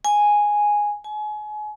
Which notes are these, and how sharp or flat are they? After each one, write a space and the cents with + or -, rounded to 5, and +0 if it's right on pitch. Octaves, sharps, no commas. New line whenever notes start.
G#5 +0
G#5 +35